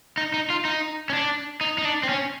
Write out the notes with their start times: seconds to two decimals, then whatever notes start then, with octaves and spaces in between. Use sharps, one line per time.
0.17 D#4
0.34 D#4
0.50 F4
0.65 D#4
1.10 C#4
1.13 D4
1.61 D#4
1.78 D#4
1.85 D4
2.03 C4
2.09 C#4